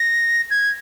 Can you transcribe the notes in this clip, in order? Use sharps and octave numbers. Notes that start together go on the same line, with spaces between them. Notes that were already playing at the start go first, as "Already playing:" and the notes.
Already playing: A#6
G#6